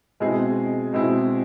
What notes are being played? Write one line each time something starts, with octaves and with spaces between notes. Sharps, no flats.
B2 G#3 C4 E4 G#4
B2 G#3 C4 E4 G#4